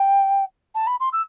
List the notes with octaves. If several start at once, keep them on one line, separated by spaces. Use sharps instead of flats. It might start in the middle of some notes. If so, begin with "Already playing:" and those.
Already playing: G5
A5
B5
C6
E6